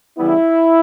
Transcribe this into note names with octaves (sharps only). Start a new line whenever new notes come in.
C#3 E3 G3 B3 E4